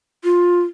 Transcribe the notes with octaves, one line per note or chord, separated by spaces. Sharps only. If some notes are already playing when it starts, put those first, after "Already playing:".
F4